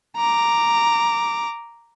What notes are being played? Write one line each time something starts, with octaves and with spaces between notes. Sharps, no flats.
A#5 D6